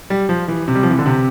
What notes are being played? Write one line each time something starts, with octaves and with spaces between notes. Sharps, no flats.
G3
F3
E3
C3
G3
F3
E3
D3
C3